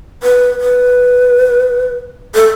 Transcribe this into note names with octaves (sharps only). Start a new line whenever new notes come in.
B4
B4
A4